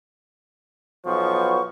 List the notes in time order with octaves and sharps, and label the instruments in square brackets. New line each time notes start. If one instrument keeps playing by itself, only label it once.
[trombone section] B1 F3 B3 [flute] C#6